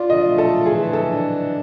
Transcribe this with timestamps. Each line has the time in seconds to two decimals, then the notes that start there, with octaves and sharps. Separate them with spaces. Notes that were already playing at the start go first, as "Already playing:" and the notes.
Already playing: F4 D5
0.10 D#5
0.24 A3
0.38 A4
0.66 E3 G#4
0.93 A4
1.08 D4